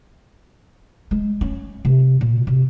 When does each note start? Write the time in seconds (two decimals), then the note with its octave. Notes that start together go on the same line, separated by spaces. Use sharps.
1.11 G#3
1.41 C#4
1.85 C3
2.21 A#2
2.47 C3